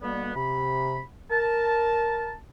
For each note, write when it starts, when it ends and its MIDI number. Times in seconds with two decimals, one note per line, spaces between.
0.02 0.34 47
0.02 0.34 50
0.02 0.34 55
0.02 0.34 58
0.02 0.34 59
0.35 1.01 48
0.35 1.01 83
1.30 2.33 70
1.30 2.33 81